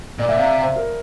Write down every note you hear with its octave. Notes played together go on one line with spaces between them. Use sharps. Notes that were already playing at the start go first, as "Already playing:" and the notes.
A#2 D5
A#2 E5
C3 F5
E5
C5
A#4